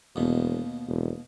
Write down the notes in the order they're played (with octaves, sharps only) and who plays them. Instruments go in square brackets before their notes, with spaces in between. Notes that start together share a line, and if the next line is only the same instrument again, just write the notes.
[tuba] E1 [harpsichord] D#2 B2
[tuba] E1